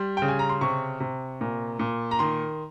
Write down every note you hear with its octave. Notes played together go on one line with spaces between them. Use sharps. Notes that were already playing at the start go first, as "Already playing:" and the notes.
Already playing: G3 C6
C#3 G5
G#5
A#5
C6
C3 C#6
C3
A#2
A#2
A#5
D#3 C6